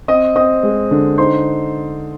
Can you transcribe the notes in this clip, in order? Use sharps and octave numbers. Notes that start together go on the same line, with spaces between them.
C4 D#5 D#6
C4 D#5 D#6
G#3
D3
D#4 C5 C6